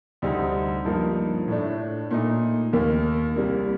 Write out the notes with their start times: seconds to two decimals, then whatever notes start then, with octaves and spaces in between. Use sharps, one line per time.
0.22 D2 C3 G3 C4 D#4
0.85 G2 F3 A#3 D#4
1.48 A2 A3 D4
2.11 A#2 A3 D#4
2.73 D#2 D#3 A#3
3.36 C2 C3 G3 A#3